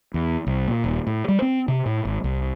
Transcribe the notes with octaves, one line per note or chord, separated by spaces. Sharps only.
E2
C2
A#2
D#1
A2
G3
C4
C3
A2
G#1
C2